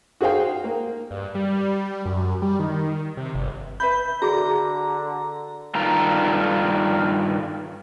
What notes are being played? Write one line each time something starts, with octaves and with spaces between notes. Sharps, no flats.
F#4 G#4 C5 F5 G5
A#3
G2
G3
F#2
G3
D#3
C3
G1
B4 E5 B5 G6
D3 F#4 G#4 A#5 D6
G2 D#3 F4 A4 A#5